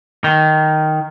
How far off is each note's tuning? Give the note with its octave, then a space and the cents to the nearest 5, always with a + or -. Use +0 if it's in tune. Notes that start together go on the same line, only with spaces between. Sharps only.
D#3 -5